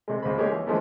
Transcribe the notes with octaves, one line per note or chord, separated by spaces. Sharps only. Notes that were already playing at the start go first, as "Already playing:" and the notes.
C3 G#3
C#2 G#3 C4 B5
G#3 A#3 G4 G#4 C#5
E3
D3 E3 F3 G#3 A3 B3